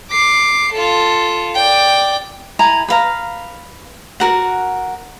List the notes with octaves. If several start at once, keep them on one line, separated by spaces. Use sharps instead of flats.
D6 C7
F4 A4
D5 G5
E4 G#5 A#5
B4 F5 A#5
F#4 A#4 F#5